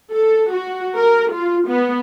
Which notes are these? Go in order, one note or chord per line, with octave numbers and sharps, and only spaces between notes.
A4
F#4
A#4
F4
B3